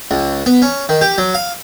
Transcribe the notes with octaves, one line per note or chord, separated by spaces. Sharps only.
C#2
B3
C#4
D#3
G4
F#3
F5